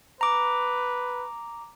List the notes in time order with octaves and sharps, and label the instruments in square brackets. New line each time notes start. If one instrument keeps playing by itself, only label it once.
[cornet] B4 [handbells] A#5 D6